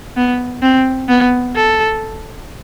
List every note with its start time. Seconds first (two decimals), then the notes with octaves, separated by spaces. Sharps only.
0.16 B3
0.63 C4
1.09 B3
1.55 A4